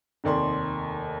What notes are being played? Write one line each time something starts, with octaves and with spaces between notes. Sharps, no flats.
F1 D#2 D5 C6